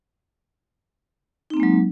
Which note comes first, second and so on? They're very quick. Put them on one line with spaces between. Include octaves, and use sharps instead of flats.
D#4 C4 A#3 G#3 F#3